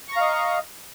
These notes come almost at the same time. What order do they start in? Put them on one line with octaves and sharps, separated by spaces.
C#6 A#5 F5 D#5